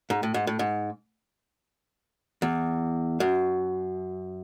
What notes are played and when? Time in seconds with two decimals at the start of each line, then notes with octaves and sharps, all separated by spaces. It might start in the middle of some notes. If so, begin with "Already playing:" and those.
0.10 G#2
0.23 A2
0.34 G#2
0.47 A2
0.59 G#2
2.42 E2
3.20 F#2